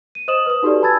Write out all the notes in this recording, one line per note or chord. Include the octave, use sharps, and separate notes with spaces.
D#7
C5 D#5 D#6 E7 F#7
B4 D#6
D#4 F#4 G4 A4 B4 D5
G#5 A5 B5 E6 G#6 A6